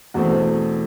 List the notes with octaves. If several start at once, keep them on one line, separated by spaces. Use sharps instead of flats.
E2 B2 A3 C4 F#4